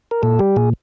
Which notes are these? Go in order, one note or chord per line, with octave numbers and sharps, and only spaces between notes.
A#4
A#2 A4
G3 G4
A#2 G#4